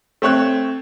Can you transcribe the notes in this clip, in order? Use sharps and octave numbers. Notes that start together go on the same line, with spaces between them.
A3 C4 C#5 F#6